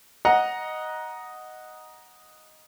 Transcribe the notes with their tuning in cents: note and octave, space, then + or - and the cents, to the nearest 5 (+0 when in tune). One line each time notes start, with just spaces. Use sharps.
D#5 +0 F#5 +0 A#5 +20